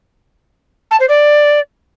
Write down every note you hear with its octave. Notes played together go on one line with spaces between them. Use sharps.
A5
C5
D5